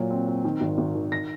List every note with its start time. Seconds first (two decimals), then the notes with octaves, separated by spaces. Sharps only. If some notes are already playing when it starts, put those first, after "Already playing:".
Already playing: A#2 F#3
0.11 C4
0.27 C4
0.45 D#3
0.61 G#1
0.78 G#1
0.95 D#3
1.12 A#6